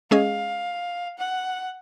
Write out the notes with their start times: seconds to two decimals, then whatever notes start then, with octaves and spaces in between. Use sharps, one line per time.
0.11 G#3 C#4 G#4 D#5 F5
1.18 F#5